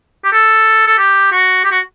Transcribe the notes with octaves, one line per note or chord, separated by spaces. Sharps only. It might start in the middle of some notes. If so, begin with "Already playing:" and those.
G4
A4
A4
G4
F#4
G4
F#4